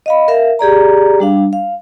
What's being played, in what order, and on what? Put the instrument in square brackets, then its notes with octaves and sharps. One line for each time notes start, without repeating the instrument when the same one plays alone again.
[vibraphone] D#5 F5 B5
A#4 E5 F5
G4 G#4 D5 A#5
G3 D4 F5
F5